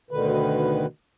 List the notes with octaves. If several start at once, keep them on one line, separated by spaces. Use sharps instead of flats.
D2 B2 D3 D#3 B4